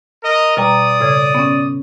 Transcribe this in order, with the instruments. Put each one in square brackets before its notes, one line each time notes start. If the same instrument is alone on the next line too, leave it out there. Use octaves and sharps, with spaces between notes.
[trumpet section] A#4 D#5
[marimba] B2 G3 A#5 [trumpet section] D5 D#6
[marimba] A2 C#3 G#6
B3 C#4